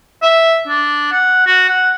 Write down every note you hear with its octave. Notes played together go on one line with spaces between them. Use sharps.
E5
D4
F#5
F#4
F#5